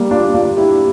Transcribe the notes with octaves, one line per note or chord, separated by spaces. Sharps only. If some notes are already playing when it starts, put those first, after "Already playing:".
Already playing: G3 A#3
D4 F4
D4 F4
E4 G4